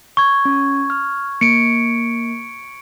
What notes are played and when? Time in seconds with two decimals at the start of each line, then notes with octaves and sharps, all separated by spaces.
0.17 C#6 G#6
0.45 C#4
0.90 F6
1.41 A#3 C#7 D7